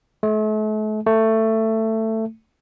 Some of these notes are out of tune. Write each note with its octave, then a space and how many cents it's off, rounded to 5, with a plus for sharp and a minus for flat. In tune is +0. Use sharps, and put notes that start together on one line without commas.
A3 -40
A3 +15